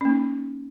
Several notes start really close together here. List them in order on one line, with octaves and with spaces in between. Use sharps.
C#4 A#3 D#4